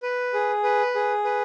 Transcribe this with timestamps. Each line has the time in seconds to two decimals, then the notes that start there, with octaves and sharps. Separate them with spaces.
0.03 B4
0.34 G#4
0.64 B4
0.95 G#4
1.25 B4